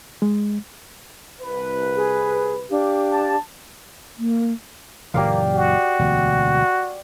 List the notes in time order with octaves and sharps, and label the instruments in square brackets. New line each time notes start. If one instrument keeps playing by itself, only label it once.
[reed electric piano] G#3
[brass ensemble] C2 B4
[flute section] G#4
D4 G4 F5
[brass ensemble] A5
[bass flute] A#3
[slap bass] F#1 A#2 E3 [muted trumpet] A#3 [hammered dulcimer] G4 D5 F5
[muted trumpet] F#4
[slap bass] E1 D2